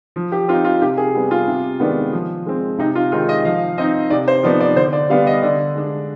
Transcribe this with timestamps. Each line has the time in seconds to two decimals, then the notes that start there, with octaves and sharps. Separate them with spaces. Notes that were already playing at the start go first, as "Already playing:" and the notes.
0.16 F3
0.32 G4
0.48 C4 D#4 F4
0.64 F4
0.82 C3 G4
0.97 G#4
1.15 G3 B3
1.31 F4
1.48 C3
1.80 D#3 G#3 B3 D4
2.12 F3
2.46 G#3 C4
2.78 C3 D#4
2.95 F4
3.12 D#3 G#3 C4 D#4 F4
3.29 D#5
3.45 F3 F5
3.78 C4 D#4 D#5
4.10 C3 D5
4.28 C5
4.43 F3 B3 D#4 D5
4.60 D5
4.76 D3 C5
4.93 D5
5.10 G3 B3 D4 F5
5.27 D#5
5.42 D3 D5
5.75 G#3 D4